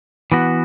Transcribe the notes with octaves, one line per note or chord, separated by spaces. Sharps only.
E3 B3 F#4